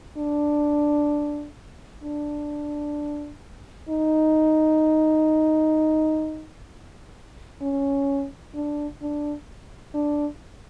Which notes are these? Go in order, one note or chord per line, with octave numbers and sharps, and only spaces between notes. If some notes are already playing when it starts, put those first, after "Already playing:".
D4
D4
D#4
C#4
D4
D4
D4